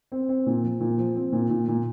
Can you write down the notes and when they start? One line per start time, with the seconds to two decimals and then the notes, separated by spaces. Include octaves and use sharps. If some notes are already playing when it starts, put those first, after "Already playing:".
0.12 C4
0.29 C4
0.46 A#2
0.63 F3
0.80 A#2
0.98 F3
1.15 C4
1.32 A#2
1.50 A#2
1.68 A#2